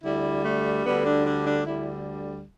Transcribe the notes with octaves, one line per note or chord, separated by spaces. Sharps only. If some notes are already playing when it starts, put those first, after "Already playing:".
D2 D3 G3 E4
A3
D2 D3 G3 B3
D4
D4
D4
D2 D3 G3 E4